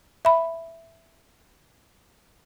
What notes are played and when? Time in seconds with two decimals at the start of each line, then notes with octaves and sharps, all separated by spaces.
0.25 E5 B5